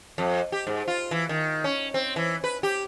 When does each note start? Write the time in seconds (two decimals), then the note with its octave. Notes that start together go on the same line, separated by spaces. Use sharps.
0.18 F2
0.52 G4
0.67 G#2
0.88 F4
1.11 E3
1.29 D#3
1.64 C#4
1.94 C4
2.16 E3
2.44 B4
2.63 G4